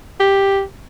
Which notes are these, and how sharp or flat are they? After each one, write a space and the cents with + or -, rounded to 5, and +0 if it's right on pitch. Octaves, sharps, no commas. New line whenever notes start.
G4 +5